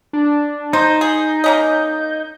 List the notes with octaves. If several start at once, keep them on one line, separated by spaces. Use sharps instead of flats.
D4
D#4 C5 G6
G#4
A#3 C#4 D#5